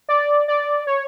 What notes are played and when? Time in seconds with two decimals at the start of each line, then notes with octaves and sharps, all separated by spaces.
0.09 D5
0.48 D5
0.87 C#5